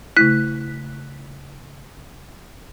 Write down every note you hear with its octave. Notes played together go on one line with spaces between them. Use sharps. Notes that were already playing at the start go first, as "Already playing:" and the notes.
C#3 A3 E4 F#6 B6